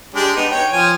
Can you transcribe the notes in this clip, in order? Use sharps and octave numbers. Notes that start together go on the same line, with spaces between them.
G#3 D4 G4
B3 D#4
C#5 G5
F3 G#5